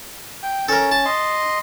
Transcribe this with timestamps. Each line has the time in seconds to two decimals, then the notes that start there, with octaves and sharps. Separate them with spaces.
0.43 G5
0.68 C#4 A4 A#4
0.92 A5
1.05 D#5 C6